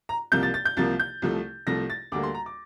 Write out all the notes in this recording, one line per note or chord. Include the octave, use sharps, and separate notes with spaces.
A#5
C2 C3 F3 A#3 G6
A6
A6
G6
C2 C3 F3 A#3 A6
G6
C2 C3 F3 A3
C2 C3 F3 A3 A#6
A6
D2 D3 G3 A#3 D6
C6
A#5
D6